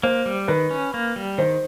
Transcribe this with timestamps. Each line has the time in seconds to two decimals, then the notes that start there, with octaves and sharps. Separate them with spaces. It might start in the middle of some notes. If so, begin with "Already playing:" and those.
0.03 A#3 C5
0.26 G3
0.48 D#3 B4
0.70 C#4
0.94 A#3
1.16 G3
1.38 D#3 C5